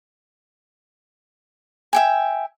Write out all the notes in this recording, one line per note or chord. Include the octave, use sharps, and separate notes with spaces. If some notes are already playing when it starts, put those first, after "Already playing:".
E5 G5 G#5